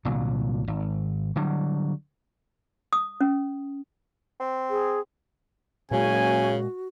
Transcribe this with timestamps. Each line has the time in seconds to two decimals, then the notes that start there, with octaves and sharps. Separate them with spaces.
0.05 C2 A#2 D3 F#3
0.67 G#1
1.36 D3 F#3 G3
2.93 D#6
3.21 C#4
4.40 C4
4.70 G#4
5.91 F#1 A#2 C#3 G#3 F#4 G#5